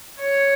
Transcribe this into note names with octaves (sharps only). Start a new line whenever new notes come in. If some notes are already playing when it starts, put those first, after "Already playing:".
C#5